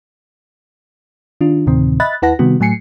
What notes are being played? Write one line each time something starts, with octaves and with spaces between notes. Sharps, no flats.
D#3 D4 F4
D2 A2 C3 D#3 C4
D#5 E5 B5 F#6 A6
D#2 E4 B4 F#5 A5 A#6
C3 D#3 G3 B3 F#4
A2 F#3 A3 G#5 C7 C#7